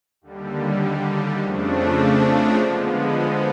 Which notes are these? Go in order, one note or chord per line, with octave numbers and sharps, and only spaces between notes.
D#2 D3 G3
F2 C#3 F3 A3 D4
D3 F3 G#3 B3